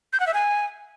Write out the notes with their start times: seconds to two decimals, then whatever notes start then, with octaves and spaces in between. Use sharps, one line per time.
0.13 G6
0.20 F#5
0.27 E5
0.34 G#5